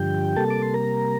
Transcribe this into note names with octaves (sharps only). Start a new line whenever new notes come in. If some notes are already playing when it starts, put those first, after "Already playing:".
Already playing: G2 D3 F3 G4 G5
C3 G3 A#3 A4 A5
D6
C6
A#4 A#5